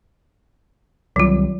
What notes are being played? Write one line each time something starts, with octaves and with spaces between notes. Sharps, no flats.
C2 D#3 F#3 G3 F4